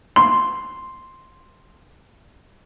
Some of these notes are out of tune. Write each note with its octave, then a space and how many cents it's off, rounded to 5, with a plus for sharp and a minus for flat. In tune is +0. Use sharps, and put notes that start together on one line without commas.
C6 +0